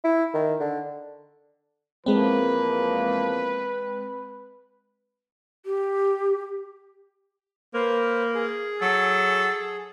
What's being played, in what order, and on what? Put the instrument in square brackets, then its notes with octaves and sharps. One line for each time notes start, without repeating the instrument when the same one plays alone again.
[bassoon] E4
D#3
D3
[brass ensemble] E2 F3 A#3 [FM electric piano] G#3 C4 [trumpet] B4
[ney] G4
[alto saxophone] A#3 [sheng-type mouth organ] B4 C5
[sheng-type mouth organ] G#4
[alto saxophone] F#3 [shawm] A4